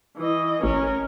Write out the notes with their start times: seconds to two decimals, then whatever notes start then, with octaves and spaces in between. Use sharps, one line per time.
0.18 E3 D#5
0.63 A1 C#4 A#4